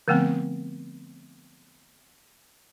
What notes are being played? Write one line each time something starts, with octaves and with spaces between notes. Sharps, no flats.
D3 F3 A3 B3 C4